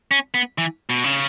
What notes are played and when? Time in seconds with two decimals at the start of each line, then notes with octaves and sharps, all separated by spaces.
0.11 C#4
0.34 B3
0.58 E3
0.90 B2
1.04 C#3